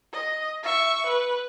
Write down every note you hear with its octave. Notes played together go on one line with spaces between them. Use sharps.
D#5
E5 C#6
B4